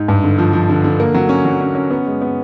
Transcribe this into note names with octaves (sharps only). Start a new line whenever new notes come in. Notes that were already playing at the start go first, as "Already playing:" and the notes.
Already playing: G#2
G2
D3
F3
F3
D3
D3
A#3
F#3
C#4
F#3
C#4
C#4
B3
G#3
B3